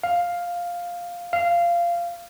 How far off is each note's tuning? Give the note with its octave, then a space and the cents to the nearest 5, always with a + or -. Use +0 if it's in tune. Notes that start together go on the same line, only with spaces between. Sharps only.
F5 +5
F5 -15